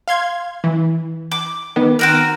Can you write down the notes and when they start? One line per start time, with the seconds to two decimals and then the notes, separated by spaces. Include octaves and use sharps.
0.08 F5 C6 G#6
0.64 E3
1.32 D6
1.76 D#3 B3
1.99 C4 F#4 A#4